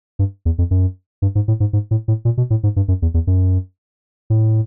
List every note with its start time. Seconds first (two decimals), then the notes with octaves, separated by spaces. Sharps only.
0.19 G2
0.45 E2
0.58 F2
0.71 F#2
1.22 G2
1.35 G#2
1.48 A2
1.60 G#2
1.73 G#2
1.91 A2
2.08 A2
2.25 A#2
2.37 B2
2.50 A2
2.63 G#2
2.76 G2
2.88 F#2
3.02 E2
3.14 E2
3.27 F#2
4.30 A2